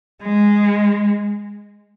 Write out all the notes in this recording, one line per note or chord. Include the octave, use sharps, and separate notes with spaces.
G#3